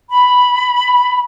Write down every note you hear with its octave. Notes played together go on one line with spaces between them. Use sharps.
B5